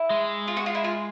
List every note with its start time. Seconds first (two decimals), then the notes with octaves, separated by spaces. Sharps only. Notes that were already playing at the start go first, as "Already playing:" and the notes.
Already playing: E4
0.10 G#3
0.48 F4
0.57 F#4
0.66 F4
0.75 E4
0.84 F4